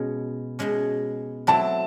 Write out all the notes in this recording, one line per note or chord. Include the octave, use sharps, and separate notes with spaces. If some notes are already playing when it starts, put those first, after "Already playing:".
Already playing: B2 G#3 C#4
B2 G#3 C#4
F#3 A3 C4 E4 A5